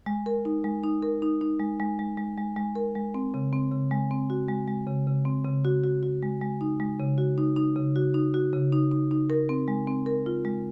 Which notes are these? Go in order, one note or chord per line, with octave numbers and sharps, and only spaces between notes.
G#3
A#4
D#4
G#3
D#4
A#4
D#4
D#4
G#3
G#3
G#3
G#3
G#3
G#3
A#4
G#3
C4
C#3
C4
C#3
G#3
C4
F#4
G#3
G#3
C#3
C#3
C4
C#3
F#4
F#4
F#4
G#3
G#3
D#4
G#3
C#3
F#4
D#4
D#4
C#3
F#4
D#4
F#4
C#3
D#4
D#4
D#4
A#4
C4
G#3
C4
A#4
F4
G#3